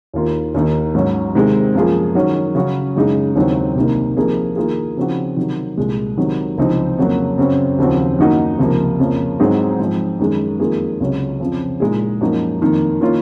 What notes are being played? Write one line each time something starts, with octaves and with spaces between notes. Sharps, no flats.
D#2 D#3 A#3 F4
D#2 D#3 A#3 D#4
G#2 F#3 C#4
C3 D#3 G#3 C4
F#2 F3 A#3 F4 G#4
D#3 F#3 C#4 F#4
C#3 F#3 C#4 F#4
F#2 C#3 G#3 D#4 G#4
D#2 C#3 F#3 C4 D#4
C2 C3 D#3 A#3 D#4
C3 F3 A#3 D#4 G#4
D#3 A#3 F4 G#4
C#3 F3 C4 D#4 F#4
C3 D#3 F#3
C2 A#2 G#3
C3 D#3 F#3
C#2 C3 F3 C4 D#4
F2 C#3 F#3 A#3
F#2 C#3 F#3 C4
D#2 C#3 F3 C4 F#4
F#2 D#3 A#3 D#4 F#4
C#2 C3 F3 A#3
F2 C#3 F3 A#3
G#2 F#3 C4 D#4 G#4
G#2 F3 C4
F#2 D#3 G#3
F2 D#3 A#3 F4 G#4
C#2 C3 F#3 C#4
F2 C#3 F3 C4
A#2 G#3 D#4 G#4
F#2 F3 A#3 D#4 F#4
F2 D#3 A#3
D#3 A#3 C#4 F4